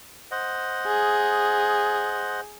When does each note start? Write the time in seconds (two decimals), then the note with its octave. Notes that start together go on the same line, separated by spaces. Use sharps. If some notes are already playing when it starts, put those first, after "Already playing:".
0.31 C5 D#5 F#5
0.87 G#4